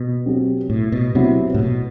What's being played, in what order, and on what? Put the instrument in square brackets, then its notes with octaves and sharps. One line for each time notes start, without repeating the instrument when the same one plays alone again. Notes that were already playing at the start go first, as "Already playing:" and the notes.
Already playing: [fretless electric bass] B2
[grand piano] F#3 C4 G4
[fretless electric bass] A2
B2
[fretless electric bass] C3 [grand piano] F#3 B3 E4
[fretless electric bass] A2
B2